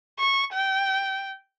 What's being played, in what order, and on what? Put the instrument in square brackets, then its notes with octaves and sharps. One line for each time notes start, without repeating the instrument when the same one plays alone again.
[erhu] C#6
G5